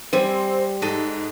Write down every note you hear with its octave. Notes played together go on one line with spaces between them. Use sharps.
G3 C4 G#5
G#2 A4 D#5